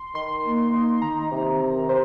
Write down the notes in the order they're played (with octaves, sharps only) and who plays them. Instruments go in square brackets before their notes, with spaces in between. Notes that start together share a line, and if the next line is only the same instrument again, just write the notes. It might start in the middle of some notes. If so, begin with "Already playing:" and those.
Already playing: [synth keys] C6
[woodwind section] D#3 [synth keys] C6
[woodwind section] A#3
D#4
[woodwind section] D#3 [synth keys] A#5
[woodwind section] C3
D#3
[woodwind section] C3 [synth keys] C5